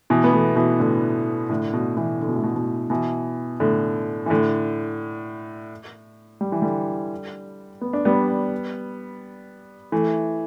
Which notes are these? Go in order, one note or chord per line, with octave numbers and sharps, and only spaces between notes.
B2 E3
B3
E3 A3
B2 E3
A2 D3
A2 D3
B2
B2 E3
D3
B2
A2
B2
B2
B2 E3
A2 D3
E3
A2 D3
G3
E3
D3 G3
B3
D4
G3 B3
E3 A3